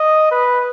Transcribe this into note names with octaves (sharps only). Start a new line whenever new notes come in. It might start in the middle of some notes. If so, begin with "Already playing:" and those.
Already playing: D#5
B4